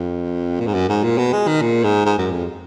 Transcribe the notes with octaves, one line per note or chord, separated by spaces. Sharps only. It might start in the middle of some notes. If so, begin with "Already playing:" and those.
Already playing: F2
A#2
G#2
F#2
G#2
A#2
B2
G#3
D#3
A#2
G#2
G#2
F#2
F2